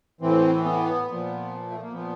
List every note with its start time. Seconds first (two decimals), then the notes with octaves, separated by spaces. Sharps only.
0.21 A2 E3 C4
0.64 B3
1.07 A#2 F3
1.71 A3
1.82 A#3
1.92 A#2 F3 B3